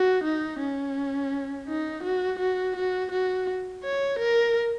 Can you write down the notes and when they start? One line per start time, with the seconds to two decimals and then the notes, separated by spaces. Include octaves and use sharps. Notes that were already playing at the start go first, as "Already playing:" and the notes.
Already playing: F#4
0.24 D#4
0.60 C#4
1.68 D#4
2.03 F#4
2.39 F#4
2.76 F#4
3.12 F#4
3.84 C#5
4.19 A#4